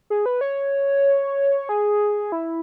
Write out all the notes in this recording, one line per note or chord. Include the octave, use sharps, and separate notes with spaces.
G#4
B4
C#5
G#4
E4